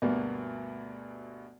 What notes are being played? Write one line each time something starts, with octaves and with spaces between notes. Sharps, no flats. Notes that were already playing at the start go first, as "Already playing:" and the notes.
D2 G2 B2 A#3 B3